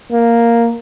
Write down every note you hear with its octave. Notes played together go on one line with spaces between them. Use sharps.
A#3